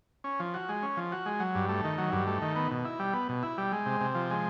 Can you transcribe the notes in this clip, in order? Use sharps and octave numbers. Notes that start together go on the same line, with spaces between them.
C#4
F3
F#4
G#3
C#4
F3
F#4
G#3
F#3
G2
A3
D#3
F#3
G2
A3
D#3
B3
B2
E4
G3
B3
B2
E4
G3
G#3
C3
C3
F3
G#3